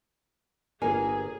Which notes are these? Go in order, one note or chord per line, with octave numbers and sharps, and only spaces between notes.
G1 A#3 G#4 C#5 G#5 A#5